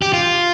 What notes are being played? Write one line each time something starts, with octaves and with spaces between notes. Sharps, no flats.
G4
F4